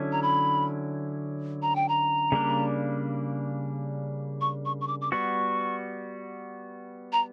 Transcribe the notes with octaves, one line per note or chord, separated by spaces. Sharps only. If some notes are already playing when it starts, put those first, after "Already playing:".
Already playing: D3 F#3 C#4 E4
A#5
B5
A#5
G5
A#5
C#3 G3 A#3 D4
C#6
C#6
C#6
D6
D6
G3 B3 F#4 C#6
A#5